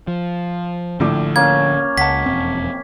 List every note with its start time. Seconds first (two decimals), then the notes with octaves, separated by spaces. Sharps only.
0.08 F3
1.00 A#1 A2 D3 D6
1.36 A#3 C#4 C#5 G#6
1.98 C#2 F#5 A5 B6
2.26 E1 F2 C4